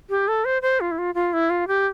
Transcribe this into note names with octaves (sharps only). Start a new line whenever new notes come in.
G4
A4
C5
C5
F4
E4
F4
F4
E4
F4
G4